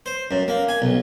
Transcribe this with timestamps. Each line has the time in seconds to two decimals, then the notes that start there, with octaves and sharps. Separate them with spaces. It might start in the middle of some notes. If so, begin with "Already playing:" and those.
0.06 C5
0.31 F#2
0.48 A#3
0.69 G#5
0.82 B1